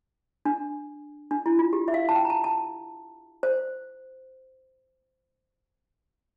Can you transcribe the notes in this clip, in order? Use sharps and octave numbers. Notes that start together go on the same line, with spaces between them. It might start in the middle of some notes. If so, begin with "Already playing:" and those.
D4
D4
E4
F4
G4
E5
F5
A5
G5
A#5
A5
A5
C5